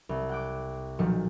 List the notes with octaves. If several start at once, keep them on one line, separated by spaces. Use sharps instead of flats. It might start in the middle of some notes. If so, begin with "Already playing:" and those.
C2
F#5 G5 D6
B1 A#2 D#3 F3 F#3 C#7